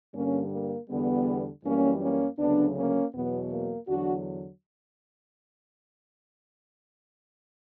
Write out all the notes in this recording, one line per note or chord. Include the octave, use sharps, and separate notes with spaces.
G2 D3 G3 A#3 C#4
A#3
E2 D3 G3 B3
F#2 E3 G3 A#3 C#4
A#3 C#4
D2 C#3 F#3 B3 D4
A#3 C#4
E2 B2 F#3 B3
A#3
E2 D3 F#3 D4 F#4